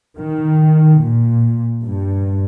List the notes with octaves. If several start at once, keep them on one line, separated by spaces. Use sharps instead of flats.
D#3
A#2
G2